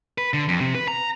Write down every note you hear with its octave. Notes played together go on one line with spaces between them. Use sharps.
B4
D3
F2
C3
B4
A#5